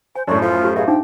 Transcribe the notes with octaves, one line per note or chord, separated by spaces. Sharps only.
C5 G#5
F#2 A2 D4 C#5
F3 F4 A4
G4
B2 G#4 E5 F5
F3 D4 D#4 G5 D6